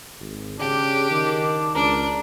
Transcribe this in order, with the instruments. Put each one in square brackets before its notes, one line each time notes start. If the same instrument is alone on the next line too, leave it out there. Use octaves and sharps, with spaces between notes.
[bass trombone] G#1
[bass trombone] C#3 [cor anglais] D4 [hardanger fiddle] G4
[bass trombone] D#3
[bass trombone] C#2 [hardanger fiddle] D4 [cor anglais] A#4